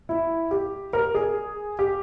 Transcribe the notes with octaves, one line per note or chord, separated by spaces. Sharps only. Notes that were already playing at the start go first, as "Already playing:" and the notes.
E4
G4
A#4
G#4
G4